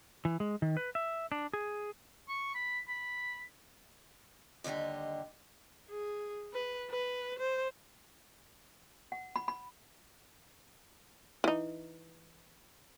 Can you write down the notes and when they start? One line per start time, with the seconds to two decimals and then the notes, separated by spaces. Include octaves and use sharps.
0.25 E3
0.40 G#3
0.62 D#3
0.77 B4
0.95 E5
1.32 D4
1.53 G#4
2.28 C#6
2.55 B5
2.88 B5
4.64 D#2 D3 G3 G4 D#5
5.90 G#4
6.53 B4
6.90 B4
7.39 C5
9.12 F#5
9.36 B5
9.48 B5
11.44 E3 D#4